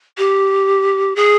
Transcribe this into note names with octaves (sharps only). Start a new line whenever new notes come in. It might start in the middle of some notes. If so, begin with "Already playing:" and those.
G4
G#4